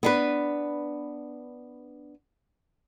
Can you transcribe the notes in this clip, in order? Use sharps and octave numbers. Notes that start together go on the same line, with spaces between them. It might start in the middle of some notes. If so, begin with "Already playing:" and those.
B3 D4 B4